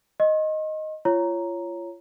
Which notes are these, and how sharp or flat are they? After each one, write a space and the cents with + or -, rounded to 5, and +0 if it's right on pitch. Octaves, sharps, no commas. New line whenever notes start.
D#5 +0 C6 +45
F4 -30 C#5 +0 A#5 +0